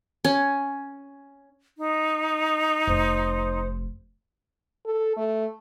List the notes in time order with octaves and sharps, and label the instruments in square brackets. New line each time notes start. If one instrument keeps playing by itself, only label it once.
[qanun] C#4
[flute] D#4
[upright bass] F1 [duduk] C5
[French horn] A4
A3